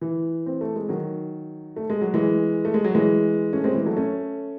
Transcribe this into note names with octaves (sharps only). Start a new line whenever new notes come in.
E3
C4
A3
G#3
D#3 F#3
A3
G#3
F#3
E3 G#3
A3
G#3
F#3
E3 G#3
A3 C#4
G#3 C4
E3 G#3
F#3 A3
A3 C#4